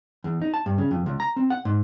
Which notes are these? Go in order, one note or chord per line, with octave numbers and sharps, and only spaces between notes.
E2
D#4
A5
G2
C#3
F2
C#2
A#5
C4
F#5
G#2